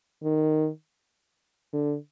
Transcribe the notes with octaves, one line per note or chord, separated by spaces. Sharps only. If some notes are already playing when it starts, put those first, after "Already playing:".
D#3
D3